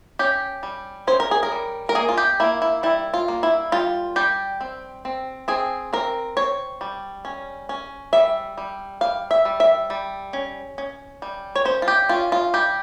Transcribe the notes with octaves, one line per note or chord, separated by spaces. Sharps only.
C#4 G4
G3
C#4 C5
A#4
G#4
A#4
G3
A#4
A#3 G#4
F4
G4
A#3 E4
E4
G3 E4
F4
A#3
E4
G3 F4
G3 G4
C4
C4
C4 G#4
C4 A#4
C4 C#5
G3
C#4
C#4
G3 E5
G3
G3 F5
E5
G3
E5
G3
C#4
C#4
G3
C#5
C#4 C5
F4
G4
C#4 F4
F4
G3 G4